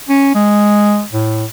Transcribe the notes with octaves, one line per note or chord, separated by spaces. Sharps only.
C#4
G#3
A2